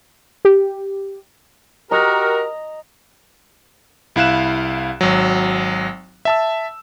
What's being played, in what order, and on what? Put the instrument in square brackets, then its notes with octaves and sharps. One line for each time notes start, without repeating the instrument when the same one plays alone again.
[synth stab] G4
[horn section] F#4 G4 A#4 [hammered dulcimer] D#5 A#5
[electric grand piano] C2 E4 F5 F#6 E7
G#1 F#3
E5 A5 E6